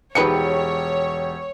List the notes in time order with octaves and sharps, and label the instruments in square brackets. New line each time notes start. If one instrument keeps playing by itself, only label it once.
[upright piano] E1 G4 C#7 [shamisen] F3 D#4 B4 [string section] C#5